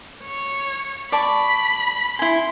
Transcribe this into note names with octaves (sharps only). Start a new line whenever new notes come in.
C#5
D5 A5 B5 C#6
E4 G#5 C6